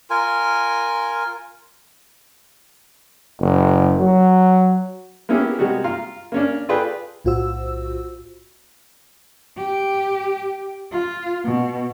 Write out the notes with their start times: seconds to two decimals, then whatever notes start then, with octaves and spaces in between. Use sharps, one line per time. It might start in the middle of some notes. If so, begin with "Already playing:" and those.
0.10 F4 A#4 G#5
3.40 F#1
4.00 F#3
5.29 A#3 B3 C#4 E4 G4 G#4
5.59 C3 G3 G#3 A#3 F#4
5.84 F4 F5 A#5
6.32 A#3 C#4 D4
6.69 F4 G#4 A4 B4 D5 G5
7.25 B1 A2 F4 F#4 C5 E6
9.57 G4
10.92 F4
11.44 B2